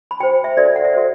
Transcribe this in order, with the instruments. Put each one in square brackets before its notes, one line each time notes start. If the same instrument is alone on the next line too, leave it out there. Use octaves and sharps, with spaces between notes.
[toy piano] B5
F#4 C5 G5
E5
F#4 A4 C5 D5
E5
F#5
E5
F#4 A4 C5